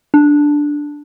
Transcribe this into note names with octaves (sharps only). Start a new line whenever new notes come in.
D4